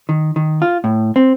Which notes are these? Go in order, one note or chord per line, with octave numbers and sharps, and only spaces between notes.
D#3
D#3
F4
A2
C4